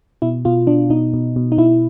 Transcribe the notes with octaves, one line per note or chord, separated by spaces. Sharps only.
B2 E4
B2 F4
B2 D4
B2 D#4
B2
B2
D#4
B2 E4